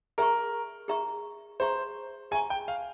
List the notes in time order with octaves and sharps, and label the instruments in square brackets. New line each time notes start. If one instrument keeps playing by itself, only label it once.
[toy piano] G#4 E5 A#5 C#6 [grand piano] A#4
[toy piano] G#4 E5 A#5 C#6
[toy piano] G#4 E5 A#5 C#6 [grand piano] C5
[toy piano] G#4 E5 A#5 C#6 [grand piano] G#5
[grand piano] G5
F5